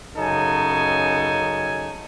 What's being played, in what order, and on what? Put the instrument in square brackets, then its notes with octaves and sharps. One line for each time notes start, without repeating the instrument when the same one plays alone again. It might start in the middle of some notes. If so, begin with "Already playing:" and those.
[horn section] F#2 C#3 D#4 A4 G#5